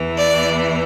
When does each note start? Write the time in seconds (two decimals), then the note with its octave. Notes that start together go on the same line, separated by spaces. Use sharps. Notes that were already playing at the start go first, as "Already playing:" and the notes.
Already playing: E2 E3
0.17 D5